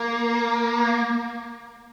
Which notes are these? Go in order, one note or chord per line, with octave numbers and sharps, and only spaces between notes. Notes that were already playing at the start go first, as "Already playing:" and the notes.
Already playing: A#3